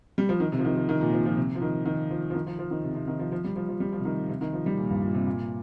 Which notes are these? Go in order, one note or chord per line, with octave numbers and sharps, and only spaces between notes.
G3
F3
D#3
C3
F3
D#3
F3
D#3
A#2
F3
F3
C3
F3
D#3
D#3
F3
F3
D#3
F3
F3
D#3
C3
C3
D#3
F3
F3
G3
F3
F3
G3
F3
C3
D#3
C3
D#3
F3
G3
A#2
G2
A#2
C3
A#2